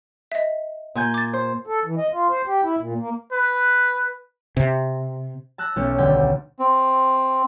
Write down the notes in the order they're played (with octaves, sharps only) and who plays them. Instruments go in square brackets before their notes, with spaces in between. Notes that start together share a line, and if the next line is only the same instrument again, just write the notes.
[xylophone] D#5 E5
[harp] A#2 G#5 G6
[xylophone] D6 A6
[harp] C5
[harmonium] A4
E3
D#5
F4
C5
G4
E4
A#2
A#3
[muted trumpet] B4
[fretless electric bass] C3
[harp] A5 E6 F#6 A#6
B1 A3 C#4 G6
D#1 D2 D3 G5
[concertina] C4